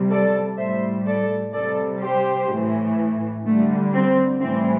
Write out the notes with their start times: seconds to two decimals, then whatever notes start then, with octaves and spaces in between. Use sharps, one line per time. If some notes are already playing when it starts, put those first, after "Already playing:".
Already playing: C3 G3
0.11 A4 D5
0.58 A2 G3 C5 E5
1.06 A4 D5
1.53 C3 G3 A4 D5
2.01 G4 C5
2.50 A2 E3 A3
3.45 D3 G3 A3
3.94 C4
4.40 A2 E3 G3 C4